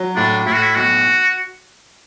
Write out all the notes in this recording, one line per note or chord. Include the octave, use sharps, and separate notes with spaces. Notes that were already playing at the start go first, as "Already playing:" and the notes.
Already playing: F#3
A2 D4
A2 E4
F#4
E4
B1 F#4